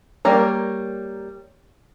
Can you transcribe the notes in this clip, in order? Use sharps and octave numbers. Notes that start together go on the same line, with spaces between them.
G3 A#3 A#4 C#5